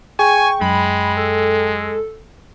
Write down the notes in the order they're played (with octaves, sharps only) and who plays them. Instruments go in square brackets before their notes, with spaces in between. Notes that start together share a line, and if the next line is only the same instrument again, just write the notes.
[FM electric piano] G#4 [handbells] G5 [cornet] G#5 [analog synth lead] C#6
[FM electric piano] F#2 [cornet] G#3 [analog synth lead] B5
[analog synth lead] A4